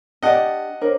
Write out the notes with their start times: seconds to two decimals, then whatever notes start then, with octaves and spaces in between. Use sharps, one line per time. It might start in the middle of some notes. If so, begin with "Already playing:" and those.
0.23 D4 G4 D5 D#5 F#5
0.82 D4 A#4 C5 C#5